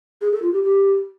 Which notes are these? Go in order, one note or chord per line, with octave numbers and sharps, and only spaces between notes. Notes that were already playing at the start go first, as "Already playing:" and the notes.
G#4
A4
F4
G4
G4